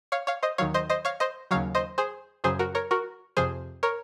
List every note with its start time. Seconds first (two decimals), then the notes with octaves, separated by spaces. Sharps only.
0.12 C#5 F5
0.27 C#5 F5
0.43 C5 D#5
0.58 D#2 D#3 F#3 C#5 F5
0.74 C5 D#5
0.90 C5 D#5
1.05 C#5 F5
1.20 C5 D#5
1.51 D#2 C#3 F#3 C#5 F5
1.75 C5 D#5
1.98 G#4 C5
2.44 F#2 C#3 F#3 G#4 C5
2.59 F#4 A#4
2.75 A#4 C#5
2.91 F#4 A#4
3.37 F2 C3 F3 G#4 C5
3.83 A#4 C#5